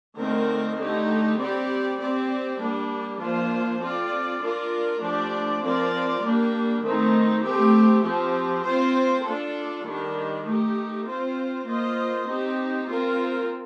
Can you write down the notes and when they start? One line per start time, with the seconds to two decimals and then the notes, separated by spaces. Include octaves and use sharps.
0.18 D3 A3 C4 D#4 A#4
0.78 D3 A3 D#4 G4
1.38 G3 C4 G4 D5
1.99 C4 G4 D5
2.59 G3 A#3 D4
3.20 F3 A#3 D4 F4 C5
3.80 C4 F4 A4 D5
4.41 D4 F4 A#4 D5
5.01 F3 A3 D4 G4 D5
5.62 F3 C4 F4 A#4 D5
6.22 G3 A#3 D4
6.83 D#3 A3 C4 D#4
7.43 A3 C4 G4
8.04 F3 C4 G4
8.64 C4 F4 C5
9.24 D4 F4 A4
9.85 D#3 G3 D4
10.46 A3 D#4 G4
11.06 C4 F4 C5
11.67 A#3 F4 C5 D#5
12.27 C4 D#4 G4
12.88 C4 F4 A#4